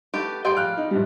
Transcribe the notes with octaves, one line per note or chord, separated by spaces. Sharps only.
A3 B3 G4
G3 G4 G#4 G5 C6 D7
F5 F6 F#6
D#4
A#1 G2 G3